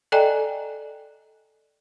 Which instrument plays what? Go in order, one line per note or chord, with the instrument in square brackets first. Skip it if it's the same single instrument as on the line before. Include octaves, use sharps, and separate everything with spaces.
[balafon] A4 D5 D#5 G5 G#5 A#5